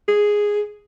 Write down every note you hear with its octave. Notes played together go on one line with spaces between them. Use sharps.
G#4